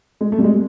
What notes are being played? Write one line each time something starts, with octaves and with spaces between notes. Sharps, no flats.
G#3
A3
G3
G#3